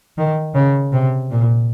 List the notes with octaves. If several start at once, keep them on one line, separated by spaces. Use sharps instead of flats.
D#3
C#3
C3
A#2